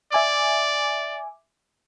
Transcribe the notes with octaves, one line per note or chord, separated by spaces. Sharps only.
D5 E5 G#5 D6